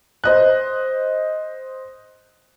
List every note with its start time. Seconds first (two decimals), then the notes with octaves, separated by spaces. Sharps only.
0.24 C5 D#5 F#6